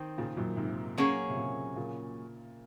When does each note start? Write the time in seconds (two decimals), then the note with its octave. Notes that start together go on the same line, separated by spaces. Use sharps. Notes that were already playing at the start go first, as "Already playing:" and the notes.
Already playing: D#3 C4
0.18 A#2 C#3
0.37 F#2 A#2
0.57 G#2 C3
0.98 F#3 A#3 C#4 G#4
1.30 C3
1.36 A#2 C#3
1.76 A#2 C#3